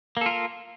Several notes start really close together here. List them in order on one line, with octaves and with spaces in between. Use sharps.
A#3 A4 F4 A#4